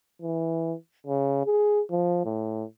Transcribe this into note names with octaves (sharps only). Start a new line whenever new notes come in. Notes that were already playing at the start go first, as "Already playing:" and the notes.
E3
C#3
G#4
F3
A2